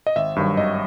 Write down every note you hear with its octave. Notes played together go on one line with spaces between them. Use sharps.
D#5
G#1 E5
G2 D#3 F#3
G#1 D#5